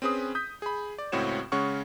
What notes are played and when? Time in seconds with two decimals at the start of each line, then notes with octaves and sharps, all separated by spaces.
0.02 C4 C#4 G#4 B4 D#6
0.35 D#6 G6 B6
0.62 G#4 B5
0.98 D5
1.12 C#2 A2 C4 F#4 C#5 E7
1.52 C#3 G#3 C#4 F#5 C#6 F6